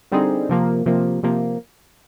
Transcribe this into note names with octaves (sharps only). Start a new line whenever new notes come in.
D3 G3 C4 D#4 G#4
C3 F3 A#3
C3 F3 A#3
C3 F3 A#3